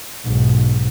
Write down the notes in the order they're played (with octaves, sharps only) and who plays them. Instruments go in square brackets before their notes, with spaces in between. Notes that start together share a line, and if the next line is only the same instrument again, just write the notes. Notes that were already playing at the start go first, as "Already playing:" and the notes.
[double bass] B1 G#2